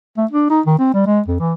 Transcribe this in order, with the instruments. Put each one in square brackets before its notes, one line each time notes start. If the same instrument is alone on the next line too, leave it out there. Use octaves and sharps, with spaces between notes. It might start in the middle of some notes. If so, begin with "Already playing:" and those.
[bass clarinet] A3
D4
D#4
D#3
C4
G3
G#3
F2
E3